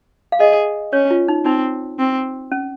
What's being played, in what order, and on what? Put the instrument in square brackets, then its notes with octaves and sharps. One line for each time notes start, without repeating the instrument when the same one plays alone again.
[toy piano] F5
[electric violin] G#4 [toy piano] D#5
[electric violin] C#4 [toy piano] C#5
[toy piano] F4
D#4
[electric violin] C4 [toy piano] D#4
[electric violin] C4
[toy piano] C#4